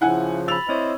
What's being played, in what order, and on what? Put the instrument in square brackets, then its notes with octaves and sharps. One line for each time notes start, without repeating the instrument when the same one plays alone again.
[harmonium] C#3 F3 [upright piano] E4 F#5 G#5
[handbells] B5 A6 [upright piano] E6 F7
[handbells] C4 C#5 [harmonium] E4 C5 D#5